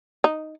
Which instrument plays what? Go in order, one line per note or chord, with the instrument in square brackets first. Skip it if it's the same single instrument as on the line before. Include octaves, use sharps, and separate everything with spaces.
[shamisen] D#4